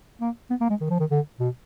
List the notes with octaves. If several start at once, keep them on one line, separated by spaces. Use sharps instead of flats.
A#3
B3
A#3
G#3
D#3
F3
D#3
D3
B2